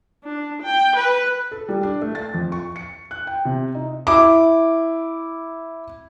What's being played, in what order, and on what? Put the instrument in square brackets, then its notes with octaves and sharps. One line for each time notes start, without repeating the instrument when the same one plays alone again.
[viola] D4
G5
B4
[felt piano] A4
G3
D4
A3
A6
F2
C#6
C#7
F#6
G5
C3
D#4
E4 D6